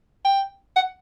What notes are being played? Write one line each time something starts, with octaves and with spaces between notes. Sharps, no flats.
G5
F#5